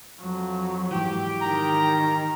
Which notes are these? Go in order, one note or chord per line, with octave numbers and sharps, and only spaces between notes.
F2 F#3
G#2 E3 G4
D#3 A#5